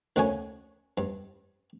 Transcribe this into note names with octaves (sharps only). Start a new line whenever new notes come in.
D2 D3 A#3 C#4 C#5 G#5
G2